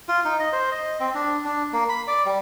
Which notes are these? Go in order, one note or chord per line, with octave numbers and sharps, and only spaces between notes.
F4
D#4
D#5
C5
D#5
C4
D4
D4
A#3
B5
D5
G3